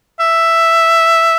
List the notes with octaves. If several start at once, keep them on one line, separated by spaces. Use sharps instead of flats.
E5